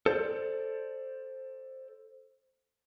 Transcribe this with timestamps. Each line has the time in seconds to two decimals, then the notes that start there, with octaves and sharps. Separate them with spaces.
0.06 A4 C5 D5